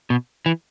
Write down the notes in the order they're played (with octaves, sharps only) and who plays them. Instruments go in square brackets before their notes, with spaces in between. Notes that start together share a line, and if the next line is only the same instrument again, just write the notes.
[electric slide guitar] B2
E3